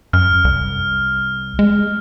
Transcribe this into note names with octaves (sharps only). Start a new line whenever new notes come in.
F#2 F6
C2
G#3